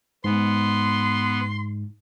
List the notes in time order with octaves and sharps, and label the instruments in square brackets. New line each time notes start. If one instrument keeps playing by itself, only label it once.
[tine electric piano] G#2 [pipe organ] B3 [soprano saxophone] C6